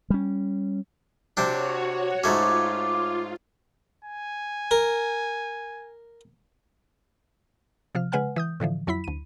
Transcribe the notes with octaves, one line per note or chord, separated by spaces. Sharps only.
G3 C#4
C3 C4 D4 F#4 C#5
G#2 A3 C#4 F4 D6
G#5
A#4
C3 F3 F6
C#3 G#3 B4 F#5 G#5 F6
E3 D#6 G6
A2 D3 E3 F3
F2 F#3 E4 B5 B6
D2 D#7